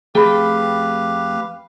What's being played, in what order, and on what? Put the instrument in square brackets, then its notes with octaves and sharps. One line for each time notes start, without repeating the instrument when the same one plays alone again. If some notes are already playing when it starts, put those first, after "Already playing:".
[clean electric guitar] F2 A3 G5 [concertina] G4 B4 F5 [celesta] G#4 B5